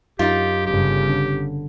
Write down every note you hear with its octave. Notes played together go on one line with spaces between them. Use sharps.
F#2 D#4 F4 G4
G1 C#3 G4
D3